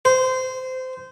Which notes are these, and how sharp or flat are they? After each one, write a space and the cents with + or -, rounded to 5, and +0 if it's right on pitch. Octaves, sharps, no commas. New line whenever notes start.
C5 -20